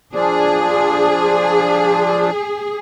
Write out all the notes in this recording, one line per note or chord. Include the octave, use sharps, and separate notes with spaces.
F3 D4 G#4